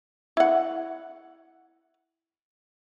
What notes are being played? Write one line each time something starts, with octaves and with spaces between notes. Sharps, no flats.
E4 F#5